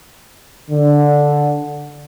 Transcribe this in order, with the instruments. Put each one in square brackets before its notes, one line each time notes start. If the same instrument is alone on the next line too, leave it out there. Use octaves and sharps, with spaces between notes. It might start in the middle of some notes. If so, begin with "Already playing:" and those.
[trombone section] D3